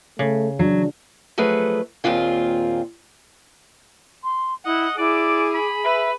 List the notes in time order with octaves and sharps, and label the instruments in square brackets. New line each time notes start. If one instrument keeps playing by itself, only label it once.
[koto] C#3 [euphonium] A3
[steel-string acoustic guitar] F#3 [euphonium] D4
[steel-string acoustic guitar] F3 F#3 A3 G#4 B4
D#2 A#2 C4 F4 G#4
[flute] C6
[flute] E4 [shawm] D#5 [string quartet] F#5
[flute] E4 [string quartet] G#4 [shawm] D5 [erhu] D6
[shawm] B5
[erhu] B4 [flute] E5